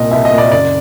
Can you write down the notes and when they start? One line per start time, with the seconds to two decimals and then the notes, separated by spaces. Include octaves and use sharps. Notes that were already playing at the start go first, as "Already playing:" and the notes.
Already playing: C2 A#2 D#5
0.11 C2 E5
0.25 D#5
0.32 A#2
0.38 D5
0.51 F#1 D5